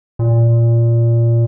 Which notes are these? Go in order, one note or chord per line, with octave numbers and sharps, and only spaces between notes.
A#2